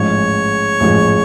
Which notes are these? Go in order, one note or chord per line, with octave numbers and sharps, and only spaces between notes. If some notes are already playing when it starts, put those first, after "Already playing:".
Already playing: A1 G#2 F3 G#3 C#5
A1 G#2 F3 G#3